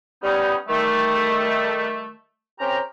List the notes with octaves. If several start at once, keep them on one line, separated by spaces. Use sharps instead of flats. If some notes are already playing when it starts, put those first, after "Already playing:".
G3 B3 C#4 D#4
D#3 G3 A3
C4 C#4 G4 A#4 C5 A#5